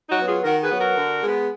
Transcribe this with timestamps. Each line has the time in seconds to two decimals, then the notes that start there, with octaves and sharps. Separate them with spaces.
0.09 D#4 F#4
0.17 F#3 B3
0.27 F4 G#4
0.43 D#3 F#4 A#4
0.62 G#4 B4
0.70 F#3 B3
0.79 F#4 A#4
0.96 D3
1.22 G#3 B3